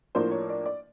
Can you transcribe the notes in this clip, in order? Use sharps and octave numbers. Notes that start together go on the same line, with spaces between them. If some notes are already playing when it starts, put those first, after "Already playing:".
A2 F3 A#3 D4 C5
C#5
D5
D5